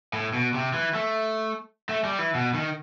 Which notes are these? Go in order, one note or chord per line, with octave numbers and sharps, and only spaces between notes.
A2
B2
C3
E3
A3
A3
G3
E3
B2
D#3